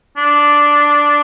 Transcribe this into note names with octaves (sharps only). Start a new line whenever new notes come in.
D4